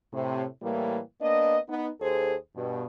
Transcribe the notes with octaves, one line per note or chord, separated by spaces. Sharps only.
A2 C3
A2 E3 G3 A#3
A#3 B3 D4 D#5
B3 D#4
D#2 G#4 A4 C5
G2 B2